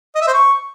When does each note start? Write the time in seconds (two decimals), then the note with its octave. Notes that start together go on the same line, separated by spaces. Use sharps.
0.15 D#5
0.21 E5
0.28 C5
0.34 C#6